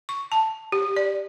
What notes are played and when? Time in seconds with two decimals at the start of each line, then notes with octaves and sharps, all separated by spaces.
0.09 C#6
0.32 A5
0.72 G4
0.96 D5